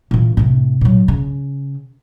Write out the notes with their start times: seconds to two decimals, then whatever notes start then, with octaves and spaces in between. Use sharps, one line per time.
0.11 A#2 E3
0.37 A2 C3
0.81 A#2 F#3
1.08 C#3